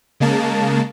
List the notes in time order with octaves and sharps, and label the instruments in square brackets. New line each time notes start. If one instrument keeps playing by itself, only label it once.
[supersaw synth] C#3 G#3 A#3 A5